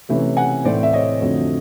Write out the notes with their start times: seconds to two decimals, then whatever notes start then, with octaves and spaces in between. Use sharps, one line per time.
0.09 C3 E3 A3 C#4 E4
0.37 F#5 G#5
0.64 A2 E3 A3 C4 C5 D5
0.83 E5
0.93 C#5 D#5
1.21 F2 D3 F#3 A3 C4